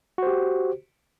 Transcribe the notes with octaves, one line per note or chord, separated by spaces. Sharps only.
F#4 G4 C5